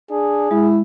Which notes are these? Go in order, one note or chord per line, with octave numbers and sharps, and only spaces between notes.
D4 G#4
G#3 E4